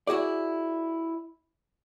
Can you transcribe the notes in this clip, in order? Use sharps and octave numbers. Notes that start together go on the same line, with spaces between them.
E4 F#4 G#4 D5